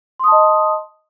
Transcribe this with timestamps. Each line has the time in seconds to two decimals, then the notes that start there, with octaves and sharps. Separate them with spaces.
0.19 C6
0.24 D#6
0.28 A5
0.32 D#5